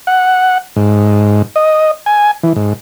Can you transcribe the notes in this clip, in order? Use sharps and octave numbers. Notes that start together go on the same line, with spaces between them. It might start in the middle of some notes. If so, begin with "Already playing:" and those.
F#5
G#2
D#5
G#5
E3
G#2